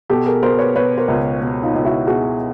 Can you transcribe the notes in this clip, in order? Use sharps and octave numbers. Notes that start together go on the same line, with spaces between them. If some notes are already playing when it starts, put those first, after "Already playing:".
B2 G4 A4
G#4 A#4
B2 A#4 C5
B4 C#5
B2 B4 C#5
A#4 C5
C#2
B2
D#4 F4
C#2
E4 F#4
B2 F#4 G#4